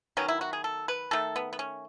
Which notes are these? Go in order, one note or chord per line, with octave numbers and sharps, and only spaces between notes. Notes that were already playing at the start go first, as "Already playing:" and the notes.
D#3 F#3 B3 C#4
E4
F#4
G#4
A4
B4
D#3 A3 A4
B3
B3
C#4